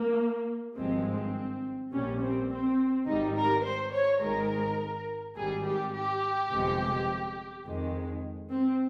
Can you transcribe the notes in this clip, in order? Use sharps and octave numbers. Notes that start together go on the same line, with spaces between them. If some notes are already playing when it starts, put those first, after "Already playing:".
Already playing: A#3
G#1 G2 F3 G#3 C4
C4
A#1 A#2 G3 C#4
C4
C4
G#1 G#2 G3 D#4
A#4
C5
C#5
G#1 G#2 D#3 G#3 A#4
G#1 G#2 G3 G#4
G4
G4
G1 F2 C3 F3 G#3
F2 D#3 G#3
C4